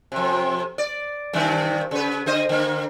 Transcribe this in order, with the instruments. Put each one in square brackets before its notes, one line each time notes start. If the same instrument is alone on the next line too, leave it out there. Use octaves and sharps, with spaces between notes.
[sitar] F2 C3
D5
G2 C3 D#3
C#3 B4
D3 C5 D#5
D3 A#3